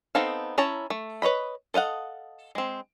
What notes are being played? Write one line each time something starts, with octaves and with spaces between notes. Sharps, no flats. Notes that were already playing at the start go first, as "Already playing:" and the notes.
B3 C4 D#4 A4 F5
C#4 E4 C#5 A5 A#5
A3
B4 C#5 D#5 B5
A4 D#5 F5 F#5
G#3 C4